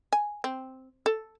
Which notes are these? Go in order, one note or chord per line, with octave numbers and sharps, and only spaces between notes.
G#5
C4
A4